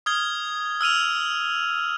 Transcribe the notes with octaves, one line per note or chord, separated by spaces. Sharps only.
D#6 F6 G#6 G7
E6 F6 D#7 F7